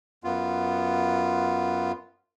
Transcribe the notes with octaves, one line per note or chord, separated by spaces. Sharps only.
F#2 B3 F4